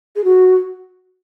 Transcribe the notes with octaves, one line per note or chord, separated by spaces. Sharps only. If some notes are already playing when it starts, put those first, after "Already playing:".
G#4
F#4